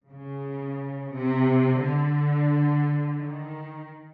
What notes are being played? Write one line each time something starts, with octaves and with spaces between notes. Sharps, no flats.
C#3
C3
D3
D#3